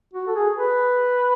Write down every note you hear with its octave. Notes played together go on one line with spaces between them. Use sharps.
F#4
A4
G#4
B4